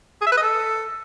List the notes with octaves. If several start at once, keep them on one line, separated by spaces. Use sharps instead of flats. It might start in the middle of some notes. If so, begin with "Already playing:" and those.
G#4
E5
B4
D#5
A4